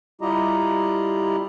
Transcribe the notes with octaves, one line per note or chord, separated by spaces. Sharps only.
G3 E4 F4 G4 D#5 A#5